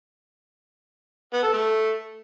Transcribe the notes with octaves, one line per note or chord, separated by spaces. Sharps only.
B3
A4
A3